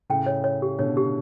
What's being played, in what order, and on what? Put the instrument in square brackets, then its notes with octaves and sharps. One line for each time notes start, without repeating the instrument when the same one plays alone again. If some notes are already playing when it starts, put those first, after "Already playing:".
[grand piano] A2 C#3 [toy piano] G5
[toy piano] C#5
C#5
G4
[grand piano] B2 D3 [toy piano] C#5
[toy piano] G4